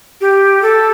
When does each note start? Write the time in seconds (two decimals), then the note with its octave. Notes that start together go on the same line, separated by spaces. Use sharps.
0.21 G4
0.62 A4